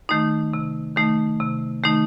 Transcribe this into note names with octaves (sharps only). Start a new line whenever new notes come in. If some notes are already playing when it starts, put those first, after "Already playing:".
D#3 A3 D#4
C3
D#3 A3 D#4
C3
D#3 A3 D#4